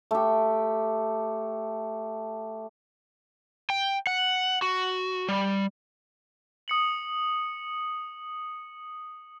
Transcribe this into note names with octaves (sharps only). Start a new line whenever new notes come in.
A3 G4
G5
F#5
F#4
G3
D#6 C#7 F#7